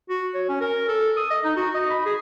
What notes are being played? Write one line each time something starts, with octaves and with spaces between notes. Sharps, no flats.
F#4
C#5
C#4
A#4
A4
D#6
D#5
D#4
F#4
D#5
B5
G#4